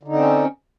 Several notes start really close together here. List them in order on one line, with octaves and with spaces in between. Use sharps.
D3 D#4 C4 C#4